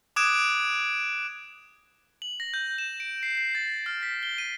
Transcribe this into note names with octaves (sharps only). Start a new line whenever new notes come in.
D6 D#6 F#6 G#6 D7 E7
F#7
A#6
G6
E7
D7
C7
C7
A6
F6
B6
G7
D#7